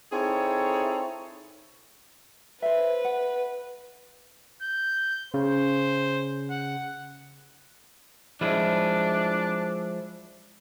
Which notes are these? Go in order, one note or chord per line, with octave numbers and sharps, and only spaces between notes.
C4 D#4 E4 G#4 A4 C#5
B4 C5 E5
F#5
G6
C#3 C5
F#5
F3 G#3 D4 E4